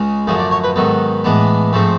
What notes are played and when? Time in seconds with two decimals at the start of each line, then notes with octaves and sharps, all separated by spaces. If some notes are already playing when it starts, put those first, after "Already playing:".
Already playing: C#2 C#3 G#3 C#4
0.27 F#2 D3 F3 A3 G#4
0.39 D5
0.51 C#5
0.64 B4
0.76 G#2 D#3 F#3 B3 A4
1.24 A2 E3 G#3 B3 D4
1.73 G#2 F3 A3 C4 A4